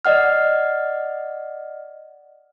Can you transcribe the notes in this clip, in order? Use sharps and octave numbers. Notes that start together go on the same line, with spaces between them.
D5 D#5 F#5 F6